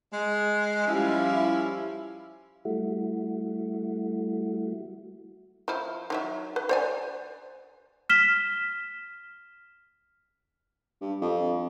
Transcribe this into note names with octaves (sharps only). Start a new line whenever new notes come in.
G#3
F3 G3 C#4 E4 F5
G3 A3 E4 F#4
F3 E4
D#3 F#3 E5
B4
C5 D5 G#5
F6 B6 E7 G7
G2
F2